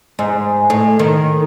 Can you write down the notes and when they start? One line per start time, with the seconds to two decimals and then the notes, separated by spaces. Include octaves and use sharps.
0.19 G#2
0.70 A2
0.99 D#3